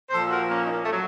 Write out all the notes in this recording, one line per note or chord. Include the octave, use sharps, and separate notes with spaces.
A#2 F3 A4 C5
A4
F#4 A#4
A#3 C#4
D#4
A#3 C#4
A3
F#3